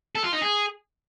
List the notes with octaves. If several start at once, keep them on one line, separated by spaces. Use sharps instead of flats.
A4
F4
D#4
G#4